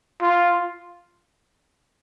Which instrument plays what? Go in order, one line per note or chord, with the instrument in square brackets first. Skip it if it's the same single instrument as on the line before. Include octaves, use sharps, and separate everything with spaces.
[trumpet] F4